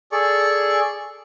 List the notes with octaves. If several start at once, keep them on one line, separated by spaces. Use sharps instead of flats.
G#4 A4 D5 C#6